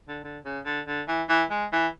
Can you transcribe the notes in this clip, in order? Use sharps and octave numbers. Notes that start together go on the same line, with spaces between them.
D3
D3
C#3
D3
D3
E3
E3
G#3
E3